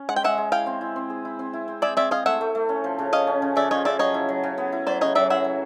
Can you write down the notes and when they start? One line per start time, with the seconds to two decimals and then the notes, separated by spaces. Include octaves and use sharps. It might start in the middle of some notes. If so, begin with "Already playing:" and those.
Already playing: C#4
0.09 G#3 F#5
0.16 G5
0.23 G#3 E5 F#5
0.38 G#3
0.52 E4 F5 G5
0.66 C4
0.81 E4
0.96 C4
1.10 G#4
1.25 E4
1.39 C4
1.53 E4
1.68 C4
1.82 G#4 D5 E5
1.97 C4 D5 E5
2.11 G#4 D#5 F5
2.26 A3 E5 F#5
2.41 A3
2.55 A3
2.69 C#4
2.84 F3
2.99 C#3
3.13 C#4 D#5 F5
3.27 C#4
3.42 C#3
3.56 C#3 D5 E5
3.71 F3 C#5 D#5
3.85 C#3 D5 E5
3.99 F#3 C#5 D#5
4.14 E4
4.29 F#3
4.43 C#3
4.58 B3
4.72 E4
4.87 F#3 C5 D5
5.01 C#3 C#5 D#5
5.15 F#3 D5 E5
5.30 E4 E5 F#5
5.44 F#3